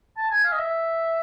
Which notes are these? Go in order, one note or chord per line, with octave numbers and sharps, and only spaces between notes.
A5
G#5
F5
D#5
E5